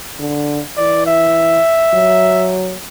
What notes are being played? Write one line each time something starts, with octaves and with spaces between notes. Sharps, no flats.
D3
E3 D5
E5
F#3